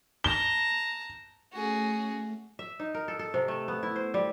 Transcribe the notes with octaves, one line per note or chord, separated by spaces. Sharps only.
A5 A#5 G7
A3 C#4 F#4 G#4
E5
D#4
A#4
A4
A4
C3
A3
B3
E4
C5
G3